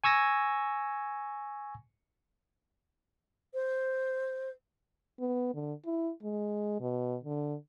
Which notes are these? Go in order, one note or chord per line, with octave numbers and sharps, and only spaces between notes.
G#5 C#6 E6 G#6 A#6
C5
B3
D3
E4
G#3
B2
D3